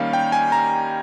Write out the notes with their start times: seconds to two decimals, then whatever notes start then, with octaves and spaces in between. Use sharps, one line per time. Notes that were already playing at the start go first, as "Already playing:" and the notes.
Already playing: D#3 G3 A#3 C#4 F5
0.13 G5
0.32 G#5
0.52 A#5